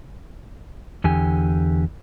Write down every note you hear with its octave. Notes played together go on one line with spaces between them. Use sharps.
E2 D3 G4 G#5